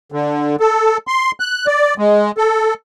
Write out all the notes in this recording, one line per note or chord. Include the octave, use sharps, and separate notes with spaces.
D3
A4
C6
F#6
D5
G#3
A4